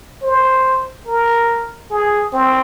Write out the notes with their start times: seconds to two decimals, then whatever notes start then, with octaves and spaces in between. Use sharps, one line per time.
0.23 C5
1.07 A#4
1.90 G#4
2.33 C4